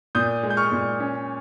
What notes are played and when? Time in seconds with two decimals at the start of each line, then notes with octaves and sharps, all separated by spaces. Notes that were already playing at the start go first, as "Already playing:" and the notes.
0.15 A#2 D#6 G6
0.43 G#3
0.50 G6
0.57 C#6 F6
0.72 A#2
1.00 C#4